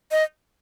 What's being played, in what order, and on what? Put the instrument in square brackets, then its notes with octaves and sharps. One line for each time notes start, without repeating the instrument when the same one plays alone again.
[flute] D#5